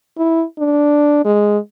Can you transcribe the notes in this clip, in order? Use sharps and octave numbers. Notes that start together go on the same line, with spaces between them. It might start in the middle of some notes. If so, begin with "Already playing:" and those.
E4
D4
G#3